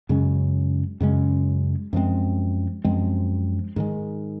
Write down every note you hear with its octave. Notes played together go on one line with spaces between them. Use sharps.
F#2 C#3 G#3 C#4
F#2 C#3 G#3 C#4
F#2 F3 G#3 C4
F#2 F3 G#3 C4
G#2 D#3 G#3